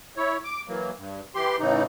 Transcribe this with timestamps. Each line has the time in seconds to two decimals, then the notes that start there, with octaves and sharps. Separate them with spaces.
0.17 E4 C#5
0.44 D6
0.68 E3 F#3 A#3
0.98 G2
1.35 E3 G4 C6
1.60 A2 C#3 E3 D#4